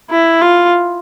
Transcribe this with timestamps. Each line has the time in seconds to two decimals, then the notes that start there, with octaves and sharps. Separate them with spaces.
0.10 E4
0.41 F4